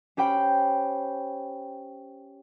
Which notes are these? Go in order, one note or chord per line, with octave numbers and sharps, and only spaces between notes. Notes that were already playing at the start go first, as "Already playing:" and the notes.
C#4 G4 C5 G5 B5